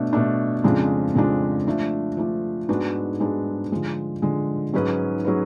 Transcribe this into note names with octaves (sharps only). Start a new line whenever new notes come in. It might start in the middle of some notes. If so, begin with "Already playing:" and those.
Already playing: B2 A3 D4
B2 A3 D4
F2 C#3 F3 G#3 D4
F2 C#3 F3 G#3 D4
F3 A3 D4
F3 A3 D4
G#2 G#3 B3 D4 F#4
G#2 G#3 B3 D4 F#4
D3 F3 G#3
D3 F3 G#3
G#2 F#3 C#4 G#4 B4
F#3 C#4 G#4 B4